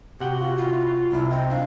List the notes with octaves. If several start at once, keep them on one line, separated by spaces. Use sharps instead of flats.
C3 F#4 G4 F#5 G5
F4
E4 F4
C2 E4
C4 D#5
D4 F5